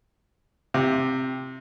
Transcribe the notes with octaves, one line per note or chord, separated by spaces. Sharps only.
C3